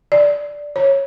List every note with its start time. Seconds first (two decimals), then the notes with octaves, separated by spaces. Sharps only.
0.12 D5
0.76 C#5